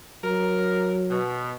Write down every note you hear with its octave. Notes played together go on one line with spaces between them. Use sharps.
F#3 A#4
B2